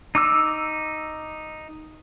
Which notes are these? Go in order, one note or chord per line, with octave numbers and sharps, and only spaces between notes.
D#4 D6 E6